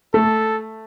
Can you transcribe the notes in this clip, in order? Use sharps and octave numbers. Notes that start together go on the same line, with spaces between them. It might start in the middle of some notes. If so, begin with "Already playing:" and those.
A3 A4